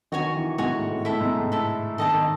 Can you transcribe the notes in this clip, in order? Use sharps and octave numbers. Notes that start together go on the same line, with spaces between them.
D#3 F#4 C#5 G#5
E3
G#2 F#4 C#5 G#5
A2
A2
A2 E4 A4 E5
G#2
A2
E4 A4 E5
D#3 A4 D#5 F#5 A5
D#3